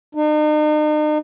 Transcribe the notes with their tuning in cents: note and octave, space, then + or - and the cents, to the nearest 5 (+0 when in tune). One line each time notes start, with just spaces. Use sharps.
D#4 -40